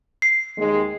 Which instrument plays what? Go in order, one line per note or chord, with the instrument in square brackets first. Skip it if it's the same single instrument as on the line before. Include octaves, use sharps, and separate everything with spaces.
[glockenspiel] C7
[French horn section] D#2 G#3